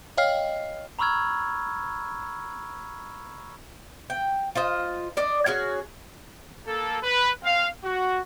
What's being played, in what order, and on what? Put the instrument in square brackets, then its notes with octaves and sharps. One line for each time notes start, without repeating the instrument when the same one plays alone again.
[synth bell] C#5 D#5 F5 G5 F6 C7
[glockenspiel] A#5 B5 C#6 E6 F6 G#6
[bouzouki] G5
F4 C5 D#5
D4 D5 D#5
C#4 F#4 G#4
[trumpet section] A#3 A4
B4
C4 F5
F#4